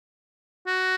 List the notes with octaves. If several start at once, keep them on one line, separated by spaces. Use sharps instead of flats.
F#4